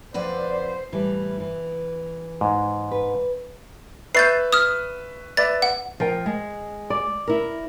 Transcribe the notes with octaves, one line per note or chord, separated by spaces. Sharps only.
F2 B4 C5 D5 F#5
A2 E3 G3
E3
G#2
B4
B4 E5 C#6 G6 A6 C7
D#6 F6
B4 D5 E5 A6
F#5
F3 A#4 G5
G#3
D5
E4 A#4